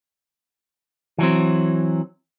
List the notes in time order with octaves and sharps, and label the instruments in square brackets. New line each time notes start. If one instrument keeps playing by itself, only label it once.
[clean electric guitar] E3 F#3 C4